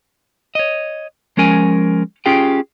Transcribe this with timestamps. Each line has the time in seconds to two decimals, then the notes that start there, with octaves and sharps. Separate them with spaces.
0.55 C#5 D#5
1.37 F3 G#3 C#4 A#4 G#5
2.26 C#4 F4 G4 G#4 G5